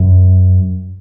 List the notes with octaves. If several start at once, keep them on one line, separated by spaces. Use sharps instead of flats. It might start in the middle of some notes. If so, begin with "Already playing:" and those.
Already playing: F#2